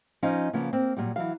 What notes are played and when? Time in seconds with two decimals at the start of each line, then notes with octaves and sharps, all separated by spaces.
0.23 F3 C#4 D#4 D#5 F5
0.53 C#3 F3 A#3 B3
0.73 A#3 C4
0.97 A#2 F#3 G3
1.16 E3 F#3 F5